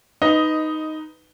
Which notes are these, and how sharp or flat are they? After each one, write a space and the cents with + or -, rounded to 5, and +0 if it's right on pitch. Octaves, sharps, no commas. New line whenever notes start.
D#4 +0 B4 +15 D#5 +10